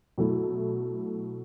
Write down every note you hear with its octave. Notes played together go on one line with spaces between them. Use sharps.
B2 F#3 A3 E4